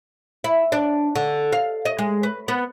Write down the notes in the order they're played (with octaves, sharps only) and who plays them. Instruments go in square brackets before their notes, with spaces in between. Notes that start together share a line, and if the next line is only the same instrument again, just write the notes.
[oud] E4
D4
D3
F5
D#5
G#3
B4
B3